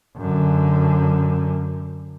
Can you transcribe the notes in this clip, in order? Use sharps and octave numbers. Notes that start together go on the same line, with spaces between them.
F#2 D3